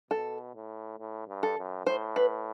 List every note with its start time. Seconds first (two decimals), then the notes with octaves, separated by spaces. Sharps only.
0.11 B2 A4
0.55 A2
0.98 A2
1.28 G2
1.43 A4
1.58 F#2
1.86 A2 C5
2.16 B4